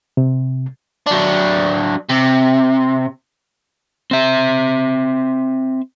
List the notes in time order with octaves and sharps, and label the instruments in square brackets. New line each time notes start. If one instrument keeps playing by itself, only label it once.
[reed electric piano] C3
[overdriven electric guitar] F#3 D4
C3
C4 E5